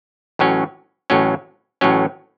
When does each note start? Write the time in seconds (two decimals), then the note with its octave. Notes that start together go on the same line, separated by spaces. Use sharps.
0.39 A1 A2 F#3 C#4
1.10 A1 A2 F#3 C#4
1.81 A1 A2 F#3 C#4